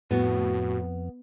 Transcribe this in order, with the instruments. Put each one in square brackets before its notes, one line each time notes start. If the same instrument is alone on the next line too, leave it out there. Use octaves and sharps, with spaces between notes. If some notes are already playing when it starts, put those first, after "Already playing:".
[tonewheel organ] F2 [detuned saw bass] A2 [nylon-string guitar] B3 [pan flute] F#4